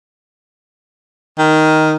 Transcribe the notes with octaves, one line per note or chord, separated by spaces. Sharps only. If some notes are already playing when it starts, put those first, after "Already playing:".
D#3